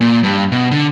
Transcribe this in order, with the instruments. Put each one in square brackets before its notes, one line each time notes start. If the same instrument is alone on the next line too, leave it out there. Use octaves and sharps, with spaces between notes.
[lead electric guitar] A#2
G2
B2
D3